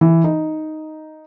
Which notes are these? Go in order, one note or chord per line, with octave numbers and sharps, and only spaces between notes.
E3
D#4